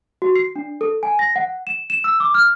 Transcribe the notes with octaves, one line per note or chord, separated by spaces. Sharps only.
F#4
C7
D4
A4
G#5
A#6
F#5
E7
E7
E6
D6
F6